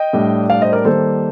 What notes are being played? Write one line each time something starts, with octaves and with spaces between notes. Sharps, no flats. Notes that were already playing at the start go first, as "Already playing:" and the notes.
Already playing: D#5 G5
A2 G3 D4
D5 F5
C5 D#5
A#4 D5
D#3 G3 A#3 A4 C5